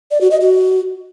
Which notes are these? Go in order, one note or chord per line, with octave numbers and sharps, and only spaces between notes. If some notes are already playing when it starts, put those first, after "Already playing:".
D5
F#4
D#5
F#4